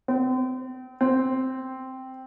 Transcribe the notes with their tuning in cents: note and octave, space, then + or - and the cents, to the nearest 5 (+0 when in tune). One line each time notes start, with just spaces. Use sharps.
C4 -35
C4 -5